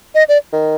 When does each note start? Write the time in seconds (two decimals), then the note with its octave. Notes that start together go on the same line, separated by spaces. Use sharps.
0.15 D#5
0.29 D5
0.53 D#3